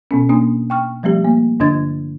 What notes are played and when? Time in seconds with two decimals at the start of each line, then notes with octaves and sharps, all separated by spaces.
0.11 B2 B3 C#4
0.29 A#3 C4 D4 D#6
0.70 G5 C#6 F6
1.03 F3 G3 A3 C4 G4
1.24 A#3
1.60 G2 D3 D4 D#5 G#6 A6